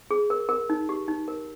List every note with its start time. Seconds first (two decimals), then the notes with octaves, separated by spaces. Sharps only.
0.11 G#4
0.30 A#4
0.49 A#4
0.70 D#4
0.89 G4
1.08 D#4
1.28 A#4